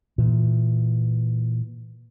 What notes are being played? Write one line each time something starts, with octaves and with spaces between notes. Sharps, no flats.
A#2 E3